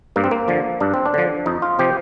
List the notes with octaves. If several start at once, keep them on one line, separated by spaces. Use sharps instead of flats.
G2 A#3
C4
A#3
D3 F3
G2 D4
C4
D4
D3 F3
F2 D#4
F4
C3 F3 G4